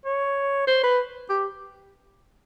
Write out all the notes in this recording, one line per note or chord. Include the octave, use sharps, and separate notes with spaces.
C#5
C5
B4
G4